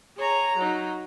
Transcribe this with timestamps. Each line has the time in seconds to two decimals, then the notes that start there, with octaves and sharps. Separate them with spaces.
0.17 G#4 C#5 A#5
0.57 F#3 D#4